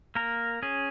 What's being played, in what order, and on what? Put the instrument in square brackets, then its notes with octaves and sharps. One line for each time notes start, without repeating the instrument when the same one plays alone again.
[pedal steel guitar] A#3 A#4
C#4 G#4